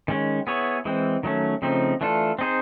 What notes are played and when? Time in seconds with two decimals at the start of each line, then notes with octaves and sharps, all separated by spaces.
0.08 D#3 G#3 C#4
0.47 B3 E4 G#4 C#5
0.85 E3 G#3 C4
1.23 D#3 F#3 A3 C#4
1.62 C#3 F3 A3 C4 D#4
2.01 E3 A3 D4 F4 A4
2.39 C4 D#4 G#4 C5